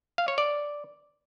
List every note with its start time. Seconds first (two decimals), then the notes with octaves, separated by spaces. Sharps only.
0.18 F5
0.28 C#5
0.38 D5